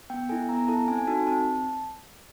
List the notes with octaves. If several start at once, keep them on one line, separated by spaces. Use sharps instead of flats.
B3 G5
E4 A4 G#5
B3 A#5
E4 A4 A5
C4 G#5
G#5
D#4 F#4 A4 A5
C4 A5